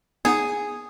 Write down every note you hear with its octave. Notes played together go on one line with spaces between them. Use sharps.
B3 D#4 G#4 F#5